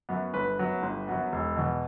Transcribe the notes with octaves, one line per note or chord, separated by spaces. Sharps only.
F#2 F#3 B3
G1 B4
F#2 F#3 B3
G1
F#2 F#3 B3
E1
E2 B2